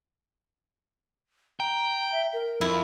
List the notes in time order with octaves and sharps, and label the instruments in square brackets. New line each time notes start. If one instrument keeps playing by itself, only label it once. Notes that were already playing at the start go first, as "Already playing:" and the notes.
[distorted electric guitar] G5 [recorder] A#5
[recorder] E5
A#4
[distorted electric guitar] F2 [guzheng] E4